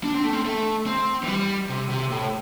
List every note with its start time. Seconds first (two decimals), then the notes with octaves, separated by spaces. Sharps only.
0.04 D4
0.14 C4
0.24 A3
0.33 C4
0.45 A3
0.86 C4
1.23 E3
1.27 G3
1.70 C3
1.90 C3
2.11 A2